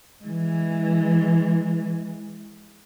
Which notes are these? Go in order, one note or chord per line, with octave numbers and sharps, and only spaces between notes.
E3 G#3